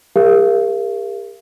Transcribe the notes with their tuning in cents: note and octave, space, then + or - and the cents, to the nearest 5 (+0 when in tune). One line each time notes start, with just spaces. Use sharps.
G4 +45 A#4 +0 F5 -40